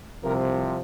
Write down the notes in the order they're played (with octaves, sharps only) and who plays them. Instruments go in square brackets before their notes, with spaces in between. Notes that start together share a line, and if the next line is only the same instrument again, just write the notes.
[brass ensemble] C2 C3 F3 A#4